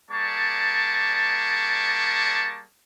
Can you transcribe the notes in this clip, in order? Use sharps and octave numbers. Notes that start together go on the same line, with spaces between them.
G3 A#3 G#4 D5 A5 C#6